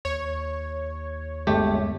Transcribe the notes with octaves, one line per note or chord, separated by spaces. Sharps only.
D#2 C#5
G1 G#3 A3 G4